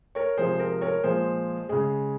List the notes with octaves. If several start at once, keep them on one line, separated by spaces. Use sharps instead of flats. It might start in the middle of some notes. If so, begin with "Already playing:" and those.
A#4 C#5
C3 F3 G#3 G#4 C5
A#4
A#4 C#5
A#2 F3 G#3 G#4 C5
C#3 G#3 G#4